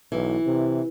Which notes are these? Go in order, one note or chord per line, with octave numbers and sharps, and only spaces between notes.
B1 E3
C3